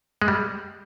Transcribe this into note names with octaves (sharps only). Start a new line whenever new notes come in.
G#3
G3